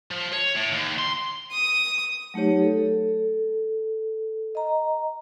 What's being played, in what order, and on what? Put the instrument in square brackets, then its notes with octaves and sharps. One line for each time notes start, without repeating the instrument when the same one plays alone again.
[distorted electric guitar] F3
C#5
A2
D#2
C6
[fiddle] D#6
[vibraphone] F#3 A3 D#4 G4 C#5
A4
D#5 A#5